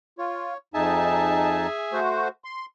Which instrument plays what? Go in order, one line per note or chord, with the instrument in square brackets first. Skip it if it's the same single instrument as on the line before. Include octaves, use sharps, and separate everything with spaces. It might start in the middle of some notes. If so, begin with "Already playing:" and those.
[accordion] F4 [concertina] C#5
[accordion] F2 D#4 A5 [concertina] G#4 E5 G#5
[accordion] A3 F#4 C5
C6